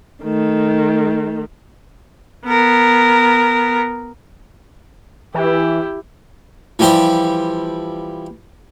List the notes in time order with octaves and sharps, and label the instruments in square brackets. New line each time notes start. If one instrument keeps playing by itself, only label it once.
[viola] D#3 A3
B3 A#4
[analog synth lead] E3 [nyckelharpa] E4 G4
[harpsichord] E3 F3 G3 G4 C5 E5